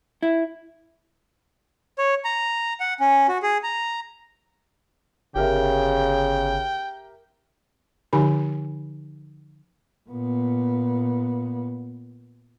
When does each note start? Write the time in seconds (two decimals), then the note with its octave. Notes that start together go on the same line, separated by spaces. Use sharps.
0.23 E4
1.98 C#5
2.25 A#5
2.80 F#5
3.00 C#4
3.29 F#4
3.43 G#4
3.63 A#5
5.36 G1 C#3 G4 A#4 E5 G5
8.13 D3 F3 D#4 G4 G#5 B5
10.10 A#2 B3